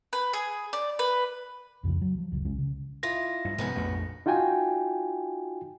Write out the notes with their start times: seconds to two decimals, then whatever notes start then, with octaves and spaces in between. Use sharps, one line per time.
0.13 B4
0.33 G#4
0.73 D5
0.99 B4
1.83 C2 F2 C#3 F3
2.01 F#3
2.18 F3
2.32 F1 C#2 F#2
2.45 C2 G#3 C#4
2.58 C#3
3.03 E4 F4 D#5 A#6
3.45 G2
3.58 G#2 C3 D#3 F3 B3 C#4
3.75 A#1 F2 A3
4.26 D#4 F4 F#4 G5 G#5